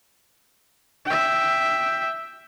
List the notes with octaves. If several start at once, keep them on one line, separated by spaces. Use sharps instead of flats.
E5 G5